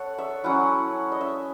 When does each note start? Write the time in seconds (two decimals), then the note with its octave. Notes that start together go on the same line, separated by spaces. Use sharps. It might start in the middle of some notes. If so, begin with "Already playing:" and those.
Already playing: A4 C#5 F#5
0.18 E5
0.44 F#3 C#4 E4 F#5
1.12 D#5
1.21 E5